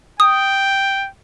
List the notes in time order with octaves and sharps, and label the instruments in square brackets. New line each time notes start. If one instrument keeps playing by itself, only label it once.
[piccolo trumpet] G5 [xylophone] D#6